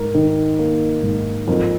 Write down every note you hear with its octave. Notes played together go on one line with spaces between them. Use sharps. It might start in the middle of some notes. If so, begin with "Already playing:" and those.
Already playing: G#2 A#4
D#3
A#3
G#2
F2 A#4